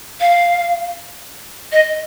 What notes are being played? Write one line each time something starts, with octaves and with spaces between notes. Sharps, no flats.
F5
D#5